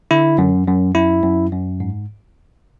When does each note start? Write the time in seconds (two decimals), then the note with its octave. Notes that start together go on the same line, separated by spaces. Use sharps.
0.11 D3 E4
0.38 F#2
0.67 F#2
0.95 F#2 E4
1.23 F#2
1.52 F#2
1.80 G#2